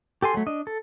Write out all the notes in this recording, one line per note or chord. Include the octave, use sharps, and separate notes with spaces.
G4 A4 G#5 C6
F#3 A3
D4 D#5
A4